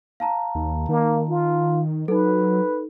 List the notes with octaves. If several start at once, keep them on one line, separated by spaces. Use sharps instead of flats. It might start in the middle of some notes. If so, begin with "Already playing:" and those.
F5 A5 A#5
D#2
D#3 A#3
F4
F#3 D#4 A4 B4